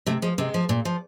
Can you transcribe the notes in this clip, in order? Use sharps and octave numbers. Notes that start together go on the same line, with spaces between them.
C3 A3
F3 G#3
C3 G#3
F3
A#2
F3